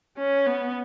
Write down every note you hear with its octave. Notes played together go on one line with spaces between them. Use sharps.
C#4
B3